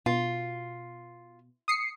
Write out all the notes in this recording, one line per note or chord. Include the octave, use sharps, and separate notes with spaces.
B2 F4
D#6 C7 C#7